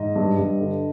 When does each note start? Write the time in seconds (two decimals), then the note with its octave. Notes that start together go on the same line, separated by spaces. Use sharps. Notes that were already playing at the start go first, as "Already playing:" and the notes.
Already playing: G#2 D#5
0.16 G2
0.38 G2
0.60 D3